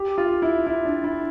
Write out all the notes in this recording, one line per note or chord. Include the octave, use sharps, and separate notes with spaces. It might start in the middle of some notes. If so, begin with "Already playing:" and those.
Already playing: G4
F4
E4
E4
D4
E4